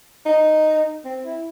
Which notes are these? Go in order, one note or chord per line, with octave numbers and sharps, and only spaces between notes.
D#4
C4
E4